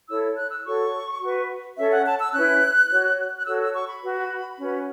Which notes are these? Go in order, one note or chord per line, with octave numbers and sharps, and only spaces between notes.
E4 A4 C#5 E6
F#6
E6
F#4 A4 C#5 C#6
F#4 B4
C#4 A4 C#5 E5
F#5
A5
E6
C#4 E4 B4 F#6
F#4 C#5
F#6
F#4 A4 C#5 E6
E6
C#6
B5
F#4 B4
C#4 F#4 B4